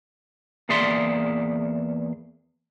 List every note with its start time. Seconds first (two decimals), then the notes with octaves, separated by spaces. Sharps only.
0.69 E2 A#3 G#4 D5 E5 C6